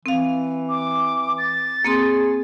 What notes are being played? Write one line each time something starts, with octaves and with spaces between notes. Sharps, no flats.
E3 C4 F5
D6
A6
A#3 C4 G#4 C6